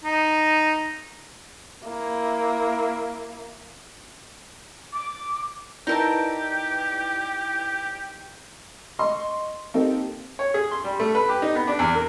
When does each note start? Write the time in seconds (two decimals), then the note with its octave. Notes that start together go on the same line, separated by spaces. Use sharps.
0.04 D#4
1.85 A#3 E4
4.93 D6
5.87 D#4 E4 G4 A#4 B4 D5 A5
8.99 D#5 C6 C#6
9.74 A#3 C4 D#4 G4 A4
10.39 C#5
10.54 G#4
10.71 C6
10.84 G3
11.00 A3
11.15 B4
11.29 G4
11.42 D#4
11.55 B3
11.67 D4
11.79 E2
11.95 A#4